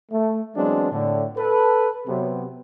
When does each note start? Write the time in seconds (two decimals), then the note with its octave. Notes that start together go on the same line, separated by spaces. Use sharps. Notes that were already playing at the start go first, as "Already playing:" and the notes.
0.11 A3
0.56 E3 F#3 G#3 B3 C4 D4
0.91 A2 D3
1.37 A4 B4
2.07 C3 F#3 B3